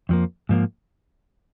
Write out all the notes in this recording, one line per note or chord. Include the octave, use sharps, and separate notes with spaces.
F2 F3 A#3
G#2 F3 A#3